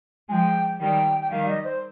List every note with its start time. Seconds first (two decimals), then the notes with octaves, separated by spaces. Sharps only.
0.29 F3 G#3 G5 G#5
0.79 D#3 G3 G5
1.21 G5
1.31 D#3 G3 F5
1.48 D#5
1.64 C5